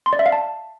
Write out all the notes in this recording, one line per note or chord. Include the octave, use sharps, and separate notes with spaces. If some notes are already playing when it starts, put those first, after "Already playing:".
C6
D5
E5
F5
A5